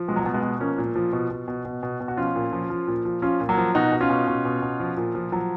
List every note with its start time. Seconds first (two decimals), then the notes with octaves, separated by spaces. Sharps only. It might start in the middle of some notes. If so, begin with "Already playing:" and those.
Already playing: F3
0.08 B2 G#3
0.16 F#3
0.24 B2 G#3
0.34 G#3 B3
0.43 B2
0.60 F3 A#3 C#4
0.78 A#2
0.96 F3
1.13 B2
1.30 B2
1.48 B2
1.65 B2
1.83 B2
2.00 B2
2.08 F#4
2.17 F3 C#4 F4
2.36 A#2
2.53 F3
2.70 F3
2.87 A#2
3.05 F3
3.22 F3 C#4 F4
3.40 A#2
3.49 F#3 A#3
3.58 F3
3.75 B2 D#4 F#4
3.92 B2
4.00 C#4 F4
4.10 B2
4.27 B2
4.45 B2
4.62 B2
4.80 F3
4.97 A#2
5.15 F3
5.32 F3 F#3